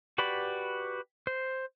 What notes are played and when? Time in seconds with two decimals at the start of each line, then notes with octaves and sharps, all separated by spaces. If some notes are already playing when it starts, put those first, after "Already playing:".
0.18 F#4 G4 B4 D5 B5
1.27 C5